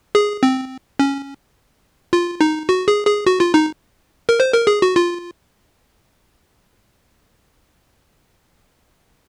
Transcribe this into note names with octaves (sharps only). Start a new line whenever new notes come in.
G#4
C4
C#4
F4
D#4
F#4
G#4
G#4
F#4
F4
D#4
A#4
C5
A#4
G#4
F#4
F4